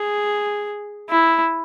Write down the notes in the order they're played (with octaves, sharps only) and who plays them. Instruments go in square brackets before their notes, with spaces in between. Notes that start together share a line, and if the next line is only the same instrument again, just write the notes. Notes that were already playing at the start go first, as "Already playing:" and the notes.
Already playing: [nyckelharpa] G#4
E4